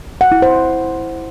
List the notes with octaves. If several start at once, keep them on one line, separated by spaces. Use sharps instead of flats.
F#5
E4
C5